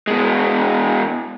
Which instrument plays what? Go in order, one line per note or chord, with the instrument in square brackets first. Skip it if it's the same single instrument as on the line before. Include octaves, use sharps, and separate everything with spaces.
[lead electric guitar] B2 G#3